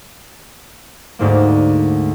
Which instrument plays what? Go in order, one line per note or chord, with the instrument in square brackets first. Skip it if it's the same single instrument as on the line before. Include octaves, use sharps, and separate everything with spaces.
[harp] D2 G#2 A#3